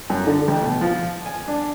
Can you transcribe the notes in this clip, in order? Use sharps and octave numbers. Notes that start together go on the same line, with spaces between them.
F#2
D3
A1
B2
F3
G#5
D4